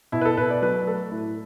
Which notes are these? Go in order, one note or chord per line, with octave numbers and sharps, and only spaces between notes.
B2 E4
B4
A4
B2 B4
D5
F#3 B4
A3 A4
A2 E4